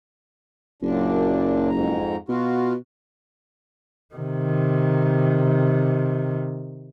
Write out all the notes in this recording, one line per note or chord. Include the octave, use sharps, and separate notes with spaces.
F#1 F#2 A#2 D4
F2 G#2 A#5
B2 F4 F#4
C3 D#3